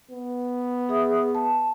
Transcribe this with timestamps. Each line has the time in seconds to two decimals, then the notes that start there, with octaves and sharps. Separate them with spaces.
0.11 B3
0.89 G#4 E5 D#6
1.35 A5